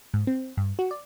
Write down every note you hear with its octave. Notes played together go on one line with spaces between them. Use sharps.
G#2
C4
G2
F#4
D5